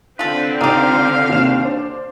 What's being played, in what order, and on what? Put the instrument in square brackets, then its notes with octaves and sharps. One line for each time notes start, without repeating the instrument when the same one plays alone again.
[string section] D3 C4 [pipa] F4 A4 [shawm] B4
[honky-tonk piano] C#2 D5 F7 [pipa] D#4 G4 [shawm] F5
[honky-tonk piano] D#2 C3 E7
D4 C5